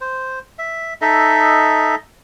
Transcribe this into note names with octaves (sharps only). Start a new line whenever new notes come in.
C5
E5
D#4 A4 D#5 E5